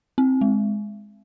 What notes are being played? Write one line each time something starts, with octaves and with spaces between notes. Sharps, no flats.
C4
G#3